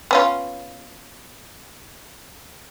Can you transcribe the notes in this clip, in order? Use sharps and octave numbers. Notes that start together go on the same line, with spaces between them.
B3 C#4 F4